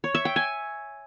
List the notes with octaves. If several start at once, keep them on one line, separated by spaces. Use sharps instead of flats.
C#5
E5
G5
G#5